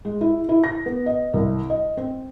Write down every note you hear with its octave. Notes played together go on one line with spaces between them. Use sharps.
G#3
E4
E4
A#6
B3
D#5
C2
D#5
C4